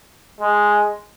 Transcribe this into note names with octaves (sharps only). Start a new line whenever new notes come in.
G#3